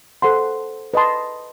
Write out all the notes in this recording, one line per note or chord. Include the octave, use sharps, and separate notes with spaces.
A4 C5 F#5 C6
B4 D#5 A5 C6